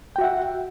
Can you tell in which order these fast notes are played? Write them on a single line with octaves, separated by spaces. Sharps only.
G5 F#4 E5 F#5